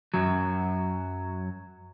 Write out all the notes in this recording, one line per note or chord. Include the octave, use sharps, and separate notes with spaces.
F#2 F#3